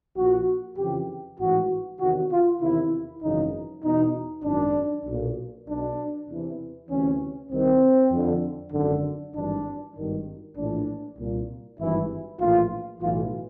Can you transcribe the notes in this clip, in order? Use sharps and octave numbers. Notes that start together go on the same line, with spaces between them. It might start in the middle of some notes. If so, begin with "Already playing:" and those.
A#1 A#2 F#4
F2 C#3 E3 G4
A1 G#2 E3 F#4
E2 C3 D#3 F#4
F4
E2 C3 D#3 E4
G#1 F#2 C#3 E3 D#4
E2 B2 D#4
G#1 F#2 D#3 D4
B1 A#2
B1 B2 D4
E2 C3 E3
D2 C3 E3 C#4
C2 C3 D#3 C4
F2 D3
G#1 F#2 D3
G#1 G2 E3 D4
G#1 G2 D#3
A#1 A2 E3 D4
C2 A#2
G#1 G2 E3 E4
A#1 A2 E3 F4
B1 A2 E3 F4